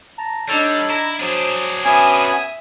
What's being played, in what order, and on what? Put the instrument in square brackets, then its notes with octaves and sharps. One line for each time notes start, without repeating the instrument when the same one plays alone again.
[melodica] A5 A#5
[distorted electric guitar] G3 [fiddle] D4 D#4 [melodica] A4 C#5
[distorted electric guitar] E4 [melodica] A#5
[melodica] F#3 [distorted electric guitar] D4 G#4 [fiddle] C5
[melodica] B3 C#4 F#4 [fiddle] E5 D#6 [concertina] G#5